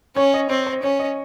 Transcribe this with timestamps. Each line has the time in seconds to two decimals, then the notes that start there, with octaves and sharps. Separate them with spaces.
0.16 C#4 C#5
0.34 D#5
0.50 C4 C#5
0.67 C5
0.83 C#4 C#5
0.99 D#5